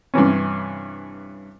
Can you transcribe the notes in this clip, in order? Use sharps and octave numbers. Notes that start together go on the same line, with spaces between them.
G2 C3 E3 C#4